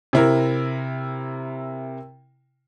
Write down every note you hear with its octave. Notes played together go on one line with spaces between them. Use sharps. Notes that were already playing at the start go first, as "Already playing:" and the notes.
C3 E4 A#4